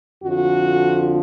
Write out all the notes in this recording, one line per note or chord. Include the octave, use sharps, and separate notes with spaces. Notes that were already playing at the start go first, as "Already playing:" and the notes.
F2 D3 F3 F#4